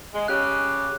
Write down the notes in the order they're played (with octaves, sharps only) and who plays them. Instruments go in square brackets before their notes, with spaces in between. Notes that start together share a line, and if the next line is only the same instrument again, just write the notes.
[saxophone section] G#3
[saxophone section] C#3 G4 [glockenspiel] F#6